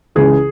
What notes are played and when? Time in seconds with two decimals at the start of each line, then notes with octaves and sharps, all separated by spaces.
0.15 C#2 C#3 E3 G#4